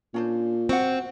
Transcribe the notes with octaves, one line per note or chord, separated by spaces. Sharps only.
A#2 C#4 D4 C5
C4 F#4 F#5